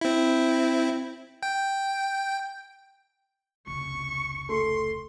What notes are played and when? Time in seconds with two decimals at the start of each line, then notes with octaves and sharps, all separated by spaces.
0.01 C4 E4
1.43 G5
3.67 F1 C#2 C#6
4.49 A3 C6